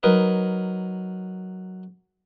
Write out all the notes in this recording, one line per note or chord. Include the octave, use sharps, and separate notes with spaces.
F#3 D#4 A#4 B4